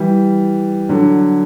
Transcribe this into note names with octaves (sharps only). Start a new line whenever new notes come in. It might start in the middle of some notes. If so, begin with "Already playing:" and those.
Already playing: E3 G3
D3 F#3